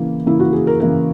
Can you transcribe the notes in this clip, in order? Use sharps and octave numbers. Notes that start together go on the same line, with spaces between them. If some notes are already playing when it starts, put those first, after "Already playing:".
Already playing: C#3 E3 A#3
C#3 E3 A#3 E4
F#4
G#4
A#4
C#3 E3 A#3 A#4